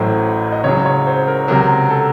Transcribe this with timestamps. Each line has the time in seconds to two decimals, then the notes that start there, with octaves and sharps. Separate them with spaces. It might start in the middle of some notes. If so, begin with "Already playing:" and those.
Already playing: A1 A2 F#3 C5
0.52 D#5
0.64 C#2 C#3 F#3 C#5
0.86 C#5
1.07 C5
1.28 A#4
1.48 C#2 C3 F#3 A#4
1.90 A4